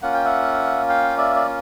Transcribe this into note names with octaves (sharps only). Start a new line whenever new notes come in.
A#3 C#4 F4 F#5
G5
E5 F#5
F5 G5
D5 E5
D5